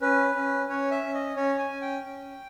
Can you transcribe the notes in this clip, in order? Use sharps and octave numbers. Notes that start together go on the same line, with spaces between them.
C#4 B4
C#4
C#4 C#5
E5
C#4
D#5
C#4 C#5
G#5
C#4
G5
C#4